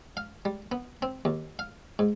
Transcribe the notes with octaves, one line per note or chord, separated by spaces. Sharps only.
F5
G3
B3
C4
D#2
F5
G#2